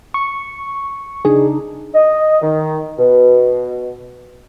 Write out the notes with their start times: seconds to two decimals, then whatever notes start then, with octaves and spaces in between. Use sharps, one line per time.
0.14 C#6
1.25 C#3 D4 D#4 G#4
1.95 D#5
2.42 D#3
2.99 B2